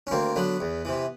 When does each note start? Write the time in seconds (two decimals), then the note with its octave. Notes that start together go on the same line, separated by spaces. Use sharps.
0.07 C#4
0.11 D2 A#3 C4
0.36 D3 F#3 B3
0.60 E2
0.85 C3 E3